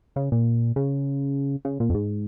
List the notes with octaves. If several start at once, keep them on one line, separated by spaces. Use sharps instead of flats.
C#3
A#2
C#3
C#3
A#2
F2
G#2